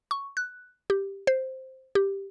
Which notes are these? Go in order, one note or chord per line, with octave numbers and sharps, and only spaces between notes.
C#6
F#6
G4
C5
G4